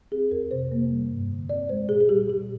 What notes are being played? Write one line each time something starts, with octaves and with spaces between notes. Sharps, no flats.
C4 G#4
F2 A#4
C3 C5
A#3
G3
G2
D3
C4 D5
G#3 C5
A#2 G#4
G#4
G3 G4
A#2 G4